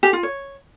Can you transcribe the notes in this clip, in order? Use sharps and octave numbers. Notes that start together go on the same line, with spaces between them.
G4
F4
C#5